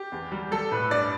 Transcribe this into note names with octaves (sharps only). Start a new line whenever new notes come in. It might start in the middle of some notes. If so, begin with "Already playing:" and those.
Already playing: G4
E2
G3
G3 A4
A2 B4
G2 D5